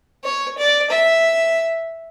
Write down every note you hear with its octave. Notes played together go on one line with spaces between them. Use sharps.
C#5
D5
E5